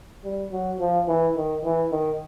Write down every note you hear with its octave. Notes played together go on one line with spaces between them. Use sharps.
G3
F#3
F3
E3
D#3
E3
D#3